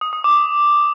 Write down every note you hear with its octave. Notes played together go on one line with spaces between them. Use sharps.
D#6
D#6
D6